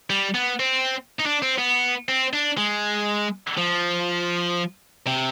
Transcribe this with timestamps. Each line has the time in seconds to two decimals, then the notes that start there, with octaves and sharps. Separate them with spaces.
0.10 G3
0.35 B3
0.60 C4
1.19 D#4
1.26 D4
1.42 C4
1.59 B3
2.09 C4
2.33 D4
2.58 G#3
3.57 F3
5.07 C3